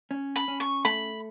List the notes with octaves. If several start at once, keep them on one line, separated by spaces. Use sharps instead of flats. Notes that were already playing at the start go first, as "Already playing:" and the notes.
C#4
B5
C#4
C#6
A3 B5